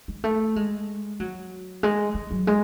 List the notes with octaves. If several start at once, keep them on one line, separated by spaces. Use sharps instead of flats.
G#3
A3
G#3
F#3
G#3
G#3
F#3
G#3